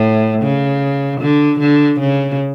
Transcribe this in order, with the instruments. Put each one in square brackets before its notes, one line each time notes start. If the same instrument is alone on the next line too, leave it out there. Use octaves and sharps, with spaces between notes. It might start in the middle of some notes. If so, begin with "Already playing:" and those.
Already playing: [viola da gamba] A2
C#3
D3
D3
C#3